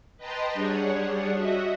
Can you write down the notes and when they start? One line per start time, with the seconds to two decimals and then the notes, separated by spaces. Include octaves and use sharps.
0.17 B4 D#5 G5 A5 A#5 C6
0.53 G3 D4 G#4 C#5 F#5
1.33 F#4 D#5 E5 F#5